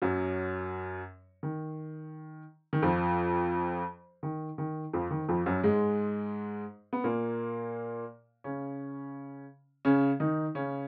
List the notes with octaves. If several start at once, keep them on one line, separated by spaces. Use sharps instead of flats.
F#2 F#3
D#3
D#3
F2 F3
D#3
D#3
F2 F3
D#3
F2 F3
F#2 F#3
G#2 G#3
B3
A#2 A#3
C#3 C#4
C#3 C#4
D#3 D#4
C#3 C#4